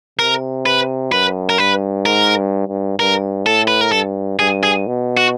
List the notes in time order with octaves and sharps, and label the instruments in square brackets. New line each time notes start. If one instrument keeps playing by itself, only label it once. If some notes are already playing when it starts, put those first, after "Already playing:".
[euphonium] C3 [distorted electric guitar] A#4
[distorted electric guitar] B4
[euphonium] F#2 [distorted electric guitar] B4
[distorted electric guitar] A#4
[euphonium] G2 [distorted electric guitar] B4
[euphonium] G#2 [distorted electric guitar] A#4
[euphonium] G2
G2
[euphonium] G2 [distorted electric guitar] A#4
[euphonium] A2 [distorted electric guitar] A4
[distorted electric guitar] B4
A#4
[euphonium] G2 [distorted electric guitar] A4
[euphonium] G2 [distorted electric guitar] G#4
[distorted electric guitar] G#4
[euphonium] B2
[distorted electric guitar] F#4